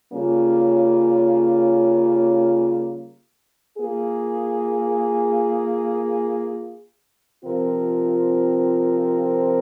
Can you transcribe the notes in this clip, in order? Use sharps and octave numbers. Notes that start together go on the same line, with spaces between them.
C#3 G3 A#3 C#4 F4
A#3 F4 G#4
C3 F3 C4 F4 A#4